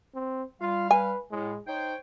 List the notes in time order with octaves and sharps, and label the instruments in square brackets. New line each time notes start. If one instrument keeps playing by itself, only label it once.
[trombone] C4
[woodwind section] G3 F5 [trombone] F4
[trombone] B4 [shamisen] G#5
[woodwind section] A2 [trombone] G#3
[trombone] D#4 [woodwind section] C5 C#5 G5